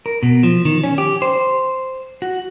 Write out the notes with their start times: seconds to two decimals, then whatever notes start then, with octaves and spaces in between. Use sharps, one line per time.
0.06 A#4
0.23 B2
0.43 F3
0.65 D#3
0.84 C#4
0.98 G4
1.22 C5
2.22 F#4